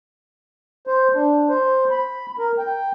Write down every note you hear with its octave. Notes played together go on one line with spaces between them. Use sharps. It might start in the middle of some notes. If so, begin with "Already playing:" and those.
C5
D4
C5
B5
A#4
G5